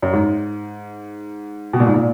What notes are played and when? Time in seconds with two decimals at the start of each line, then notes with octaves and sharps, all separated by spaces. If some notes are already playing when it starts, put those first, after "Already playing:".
0.02 F#2
0.13 G#2
1.73 B2
1.80 A#2
1.86 G#2
1.94 A#2